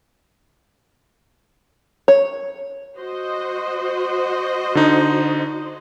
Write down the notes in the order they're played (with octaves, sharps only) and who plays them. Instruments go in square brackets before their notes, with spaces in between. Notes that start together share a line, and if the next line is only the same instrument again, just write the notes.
[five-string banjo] C#5
[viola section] F#4 C5 D#5
[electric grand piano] D3 D#4